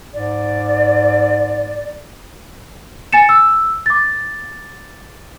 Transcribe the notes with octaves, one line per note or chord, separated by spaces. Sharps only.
G#2 D5
G#5 A6 C#7 E7
E6
D6 A6